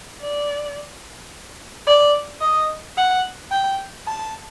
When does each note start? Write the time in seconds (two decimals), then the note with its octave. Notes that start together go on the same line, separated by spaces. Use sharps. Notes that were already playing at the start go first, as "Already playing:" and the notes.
0.21 D5
1.87 D5
2.41 D#5
2.97 F#5
3.51 G5
4.07 A5